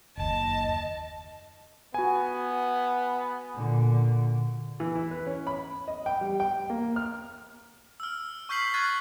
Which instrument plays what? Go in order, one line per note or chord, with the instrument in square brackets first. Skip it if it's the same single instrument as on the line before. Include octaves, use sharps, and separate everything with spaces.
[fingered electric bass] F#1 D#2 [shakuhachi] D#5 [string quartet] A5
[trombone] B3 [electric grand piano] F#4 G#5
[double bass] A#2 D3
[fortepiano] E3
E4
B4
C#4
B5
D#5
G5
G3
G5
A#3
F6
[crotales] E6 F6
C#6 F6 G6 B6 C7 F#7
C#6 F6 F#6 G#6 A6